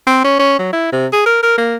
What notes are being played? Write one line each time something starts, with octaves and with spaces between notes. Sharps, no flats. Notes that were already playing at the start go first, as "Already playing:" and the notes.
C4
C#4
C#4
F#3
E4
C3
G#4
A#4
A#4
A#3